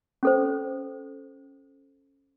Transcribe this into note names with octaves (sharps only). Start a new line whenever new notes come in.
C#4 A4 C5